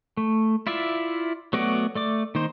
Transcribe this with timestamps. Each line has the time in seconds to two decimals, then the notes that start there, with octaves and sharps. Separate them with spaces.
0.17 A3
0.67 E4 F4 D5 E5
1.53 F#3 A3 B3 F#4 D5
1.95 A3 D5 D6
2.35 D#3 A#3 D#4 C5